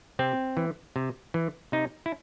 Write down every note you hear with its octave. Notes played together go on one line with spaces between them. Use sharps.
C3 C4
E3
C3
E3
C3 D#4
E4